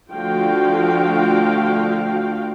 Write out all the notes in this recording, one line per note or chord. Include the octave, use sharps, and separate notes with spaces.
D3 F3 A3 F#4 F5 G5